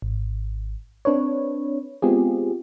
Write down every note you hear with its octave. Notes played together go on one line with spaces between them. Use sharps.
G#1
C4 D4 B4 C#5
G#3 B3 C4 F4 G4 G#4